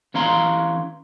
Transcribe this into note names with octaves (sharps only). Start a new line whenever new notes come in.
E3 C#4 C#5 F5 A#5 C6